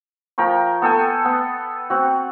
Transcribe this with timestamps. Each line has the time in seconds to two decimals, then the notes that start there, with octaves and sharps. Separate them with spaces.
0.38 F3 A#4 G5 C#6
0.82 B3 A4 G5 G#5
1.25 B3
1.90 C4 F#4